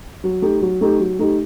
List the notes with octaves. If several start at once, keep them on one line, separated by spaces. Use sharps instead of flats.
F#3
A3 D#4 G4
F#3
A3 D#4 G4
F#3
A3 D#4 G4